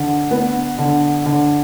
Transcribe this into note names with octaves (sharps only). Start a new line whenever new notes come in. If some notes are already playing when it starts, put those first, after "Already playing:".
Already playing: D3
B3
D3
D3